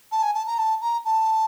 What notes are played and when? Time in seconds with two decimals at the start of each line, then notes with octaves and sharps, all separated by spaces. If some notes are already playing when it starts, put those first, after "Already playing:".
0.12 A5
0.23 G#5
0.35 A5
0.47 A#5
0.58 A5
0.81 A#5
1.05 A5